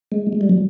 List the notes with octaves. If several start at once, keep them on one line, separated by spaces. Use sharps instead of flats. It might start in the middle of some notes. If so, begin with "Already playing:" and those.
G#3
G#3
G3
F#3